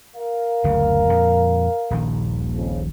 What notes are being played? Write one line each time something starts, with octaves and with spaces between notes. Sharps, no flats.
A#4 F5
F#1 D2 C#3
F2 A#2 F3
D#1 A#1 D#3
F2 C#3 F3